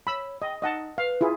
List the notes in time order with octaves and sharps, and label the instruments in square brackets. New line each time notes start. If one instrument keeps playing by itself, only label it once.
[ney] C#5 [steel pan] B5 E6
[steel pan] D#5 [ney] G5
[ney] D#4 [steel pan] D#5 F#5 A5
[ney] B4 [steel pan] F5
[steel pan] E4 F4 G#4